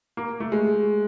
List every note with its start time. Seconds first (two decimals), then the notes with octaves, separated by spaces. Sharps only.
0.17 A#3
0.40 A3
0.52 G#3